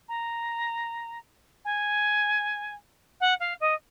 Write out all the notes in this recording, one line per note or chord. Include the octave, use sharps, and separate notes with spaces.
A#5
G#5
F#5
F5
D#5